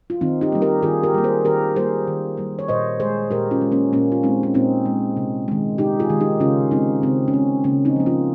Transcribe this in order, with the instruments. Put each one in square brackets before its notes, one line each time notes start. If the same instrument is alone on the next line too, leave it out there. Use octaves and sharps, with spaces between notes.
[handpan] F4
D#3 C4 D#4
D#4 G4
G3 A#3
G4 A#4
D#3 F4 G#4
G4 A#4
G3 A#3
G#4 C5
D#3 G4 A#4
G3 A#3 G#4 C5
D#3
G3 A#3
C#5
A#2 C5 D#5
G#3 G#4 C5
A#2 G4 A#4
C#4 F4
G#3
A#3 C#4
A#2 A#3 C#4
F4
G#3 C4 D#4
C#4
A#2 C4 D#4
G#3
C3
D#3 G#3
C3 D#4 G4
F4 G#4
D#3 G#3
D#4 G4
C#3 C#4 F4
G#3 C4 D#4
C#3 C4
C#4
G#3 C4
C#3 A#3 C#4
C4 D#4
F3 A#3
C#4 F4